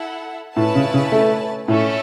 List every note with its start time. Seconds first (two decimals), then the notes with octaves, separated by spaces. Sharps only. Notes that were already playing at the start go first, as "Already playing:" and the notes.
Already playing: E4 A4 F#5
0.56 A2 C#4 E4 B4 A5
0.75 C#3
0.94 C#3
1.12 A3
1.68 A2 A3 C#4 E4 A4